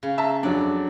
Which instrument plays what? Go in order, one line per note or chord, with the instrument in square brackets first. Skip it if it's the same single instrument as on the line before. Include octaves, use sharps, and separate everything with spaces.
[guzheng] C#3
[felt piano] E5 A5 A#5
[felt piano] F2 F#3 D4 [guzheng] D5